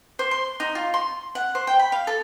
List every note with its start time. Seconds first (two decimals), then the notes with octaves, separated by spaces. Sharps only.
0.19 C5
0.31 C6
0.60 D#4
0.75 F4
0.94 C6
1.35 F#5
1.55 C5
1.67 G5
1.79 B5
1.92 F5
2.07 A4